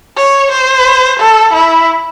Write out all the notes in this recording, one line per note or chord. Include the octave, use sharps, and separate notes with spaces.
C#5
C5
A4
E4